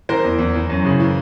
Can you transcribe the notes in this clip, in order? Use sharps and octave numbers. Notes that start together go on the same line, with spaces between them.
E3 A#4 C5
E2
E2
E3
F#2
C#3
E3